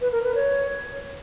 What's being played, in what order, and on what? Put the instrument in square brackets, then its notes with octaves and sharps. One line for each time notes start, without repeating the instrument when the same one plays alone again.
[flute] B4
A#4
B4
C#5